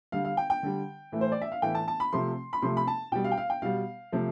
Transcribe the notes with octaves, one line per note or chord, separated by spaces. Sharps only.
D3 G3 F5
F5
G5
G5
D3 G3
A2 E3 A3
C5
D5
E5
F5
A2 E3 A3 G5
A5
A5
B5
C3 F3 A3 C6
B5
C3 F3 A3 C6
B5
A5
B2 G3 G5
F5
G5
F5
G5
B2 G3 F5
C3 F3 A3